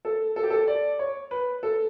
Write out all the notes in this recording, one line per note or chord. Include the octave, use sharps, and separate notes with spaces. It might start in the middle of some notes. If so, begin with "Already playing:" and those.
A4
A4
G4
A4
D5
C#5
B4
A4